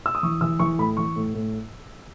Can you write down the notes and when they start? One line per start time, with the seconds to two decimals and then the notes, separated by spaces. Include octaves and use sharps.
0.06 E6
0.15 D#6
0.23 E3 C#6
0.41 E3 E6
0.59 E3 C#6
0.78 A2 B5
0.97 E3 C#6
1.16 A2
1.34 A2